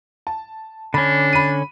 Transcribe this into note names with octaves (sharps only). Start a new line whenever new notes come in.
A5
D3 C#4 D4 B5
B5 D#7